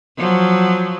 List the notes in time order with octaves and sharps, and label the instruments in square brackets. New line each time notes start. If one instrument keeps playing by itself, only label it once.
[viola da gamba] F3 F#3